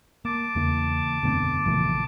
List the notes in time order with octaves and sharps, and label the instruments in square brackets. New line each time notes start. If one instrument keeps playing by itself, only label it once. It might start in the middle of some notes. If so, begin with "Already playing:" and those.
[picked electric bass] A#3 [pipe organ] A5 D6
[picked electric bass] E2 [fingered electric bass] C#3 E3 A#3
[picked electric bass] E1 A3 C4 [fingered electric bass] F#2 D3 B3
[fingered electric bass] A#1 A#2 A3 [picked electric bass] C#3 E3 F3